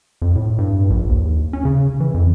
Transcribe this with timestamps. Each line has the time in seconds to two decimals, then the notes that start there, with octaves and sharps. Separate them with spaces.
0.22 F2
0.35 A2
0.58 G2
0.90 A#1
1.09 D#2
1.53 C#4
1.65 C#3
2.00 E3
2.14 F2